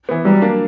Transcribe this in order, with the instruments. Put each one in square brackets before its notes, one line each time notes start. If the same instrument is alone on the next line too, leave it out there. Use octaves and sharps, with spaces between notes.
[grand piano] E3 B3
[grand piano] F#3 [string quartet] G3
[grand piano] A#3 D4